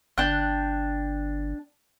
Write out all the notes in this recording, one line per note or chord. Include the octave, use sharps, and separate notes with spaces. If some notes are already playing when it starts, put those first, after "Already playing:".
G1 D4 G5 F#6